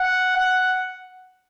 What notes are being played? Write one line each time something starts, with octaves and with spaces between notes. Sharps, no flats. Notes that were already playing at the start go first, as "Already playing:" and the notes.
Already playing: F#5
F#5